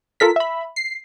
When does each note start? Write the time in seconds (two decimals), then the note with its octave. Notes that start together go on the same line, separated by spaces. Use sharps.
0.20 F4 A4 A#4 B6
0.36 E5 B5
0.76 C7